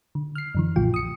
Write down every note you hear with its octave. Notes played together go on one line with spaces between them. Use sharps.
D3
F6 C7
F#2 D3 E3
B1 A#2 F3 F4 G5
D#6 C#7